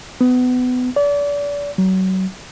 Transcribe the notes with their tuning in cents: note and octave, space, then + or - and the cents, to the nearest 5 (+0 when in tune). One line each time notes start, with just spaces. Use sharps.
B3 +25
D5 -35
F#3 +30